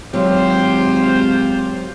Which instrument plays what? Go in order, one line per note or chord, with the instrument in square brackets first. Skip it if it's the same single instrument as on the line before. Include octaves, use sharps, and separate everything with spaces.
[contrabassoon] G#1 [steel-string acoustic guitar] F#3 [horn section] F4 G4 C5